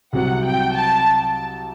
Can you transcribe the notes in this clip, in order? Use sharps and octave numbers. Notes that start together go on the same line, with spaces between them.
C2 C3 F#3 F#5
G5
A5